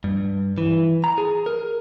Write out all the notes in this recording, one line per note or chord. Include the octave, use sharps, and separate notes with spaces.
G2
E3
A#5
G#4
A#4